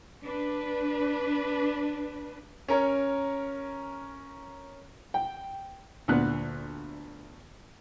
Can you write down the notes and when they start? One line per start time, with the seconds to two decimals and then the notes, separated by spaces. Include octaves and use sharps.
0.23 D4 B4
2.68 C#4 A#4 C#5
5.14 G5
6.08 D2 A#2 B3 F#6